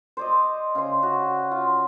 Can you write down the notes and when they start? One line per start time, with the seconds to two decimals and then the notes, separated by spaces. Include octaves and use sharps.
0.17 C5 D5 D#5
0.75 C#3 C5
1.03 F#4
1.51 F4